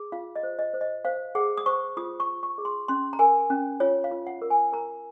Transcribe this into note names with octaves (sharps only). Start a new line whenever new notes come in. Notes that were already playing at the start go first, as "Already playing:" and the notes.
Already playing: G#4
F4 F5
D#5
C5
D#5
C5
D#5
C5 F5
G#4 F#5
D#6
C5 C#6
F4 D#6
C#6
F4
C#6
G#4
C6
C#4 C6
A#5
A#4 G#5
C#4
F4 C#5
F5
F4
F#5
A#4
G#5
A#4 A#5